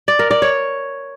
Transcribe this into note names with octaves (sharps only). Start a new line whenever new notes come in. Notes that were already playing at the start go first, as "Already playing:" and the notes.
D5
A#4
D5
C#5